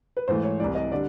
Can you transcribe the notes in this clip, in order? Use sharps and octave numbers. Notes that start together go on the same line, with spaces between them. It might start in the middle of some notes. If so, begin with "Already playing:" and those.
B4
G#2 E3 A3 C5
C#5
C2 C3 E3 D5
D#5
D3 G3 D5